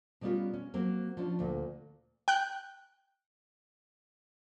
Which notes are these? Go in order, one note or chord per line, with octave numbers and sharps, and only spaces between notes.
B2 G3 B3 C#4 F4 A#4
C#4
F#3 A#3 C4
F3 C#4 D4
D2 A#2
G5 F#6 G6